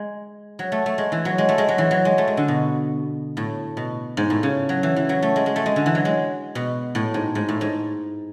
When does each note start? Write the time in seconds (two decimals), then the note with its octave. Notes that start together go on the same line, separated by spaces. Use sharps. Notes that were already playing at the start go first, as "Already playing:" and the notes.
Already playing: G#3
0.59 F#3
0.72 A3
0.86 A3
0.98 G#3
1.12 E3
1.25 F#3
1.38 G#3
1.49 A3
1.58 G#3
1.68 F#3
1.78 E3
1.91 F#3
2.05 G#3
2.18 A3
2.28 G#3
2.37 D3
2.48 B2
3.37 A2
3.77 B2
4.17 G#2
4.30 A2
4.43 C#3
4.69 F#3
4.83 E3
4.96 E3
5.09 F#3
5.22 A3
5.36 G#3
5.46 G#3
5.56 A3
5.66 G#3
5.76 D3
5.86 E3
5.95 F#3
6.05 G#3
6.55 B2
6.95 A2
7.14 G#2
7.35 G#2
7.49 A2
7.61 G#2